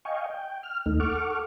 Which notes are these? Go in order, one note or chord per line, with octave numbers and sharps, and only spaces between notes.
D#5 F5 G5 G#5 C#6
G5
F6
D#2 A3 D#4
A4 F#5 C#6 D6 F6